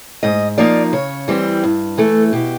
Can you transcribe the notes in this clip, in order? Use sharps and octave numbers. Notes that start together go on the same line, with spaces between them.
G#2 D#5
F3 A#3 D#4 D5
C#3 C#5
E3 G3 C4
G2
E3 A3 A4
B2 G4